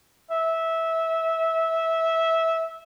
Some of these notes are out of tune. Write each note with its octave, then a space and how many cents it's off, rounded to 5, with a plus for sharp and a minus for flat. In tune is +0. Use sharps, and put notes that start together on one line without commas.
E5 -15